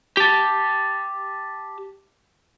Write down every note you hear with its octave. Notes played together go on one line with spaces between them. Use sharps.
G4 A5